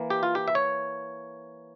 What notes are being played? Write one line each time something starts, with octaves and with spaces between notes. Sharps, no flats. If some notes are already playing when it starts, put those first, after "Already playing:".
Already playing: E3 A#3
G4
F4
G4
E5
C#5